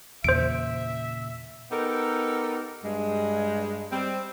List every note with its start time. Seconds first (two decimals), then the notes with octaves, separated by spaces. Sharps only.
0.24 E2 A#2 C#3 C5 E5 D7
1.71 B3 D#4 G4 A4 A#4
2.84 G2 G#3
3.92 G3 C4